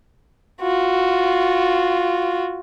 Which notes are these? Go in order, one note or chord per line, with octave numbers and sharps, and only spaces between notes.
F4 F#4